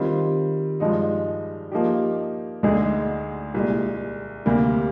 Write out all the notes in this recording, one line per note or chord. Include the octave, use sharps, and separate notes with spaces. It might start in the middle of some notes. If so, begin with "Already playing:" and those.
Already playing: D#3 G3 C4 F4
G2 F3 G#3 D#4
F3 A#3 D#4 G4
D2 D3 G#3 D#4 G#4
C2 A#2 G#3
D2 C3 G3 A#3